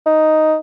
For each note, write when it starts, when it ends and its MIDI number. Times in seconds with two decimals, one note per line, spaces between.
0.06 0.56 63